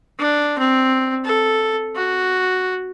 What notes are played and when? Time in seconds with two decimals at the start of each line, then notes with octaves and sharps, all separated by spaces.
0.19 D4
0.58 C4
1.25 A4
1.96 F#4